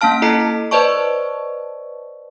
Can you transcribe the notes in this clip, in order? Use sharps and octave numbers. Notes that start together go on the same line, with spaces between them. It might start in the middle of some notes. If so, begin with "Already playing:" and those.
A#3 C#4 F5 A5 F6
E4 A4 D#5 A#5 B6 C7
B4 C5 D5 D#5 A5 C#6